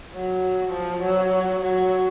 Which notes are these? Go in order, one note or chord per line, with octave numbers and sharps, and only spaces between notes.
F#3
F3
F#3
F#3